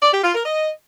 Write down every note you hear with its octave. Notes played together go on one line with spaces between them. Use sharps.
D5
G4
F4
A#4
D#5